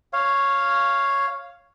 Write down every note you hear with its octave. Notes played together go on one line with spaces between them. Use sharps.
C#5 F5